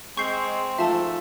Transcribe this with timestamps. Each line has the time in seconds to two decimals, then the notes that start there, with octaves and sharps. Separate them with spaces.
0.17 G#3 C4 C#6 G6 C7
0.78 G#2 F3 A3 E5 A5